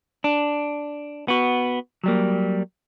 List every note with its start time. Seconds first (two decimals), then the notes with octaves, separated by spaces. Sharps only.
0.24 D4
1.28 B3 F#4
2.04 F#3 G3 A#3